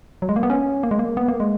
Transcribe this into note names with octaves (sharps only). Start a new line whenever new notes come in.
F#3
G#3
A#3
B3
C#4
A#3
G#3
A#3
B3
A#3
G#3